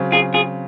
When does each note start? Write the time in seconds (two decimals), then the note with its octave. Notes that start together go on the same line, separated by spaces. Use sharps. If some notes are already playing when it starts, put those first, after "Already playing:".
Already playing: C#3 F#3 C4
0.12 F4 G#4
0.34 F4 G#4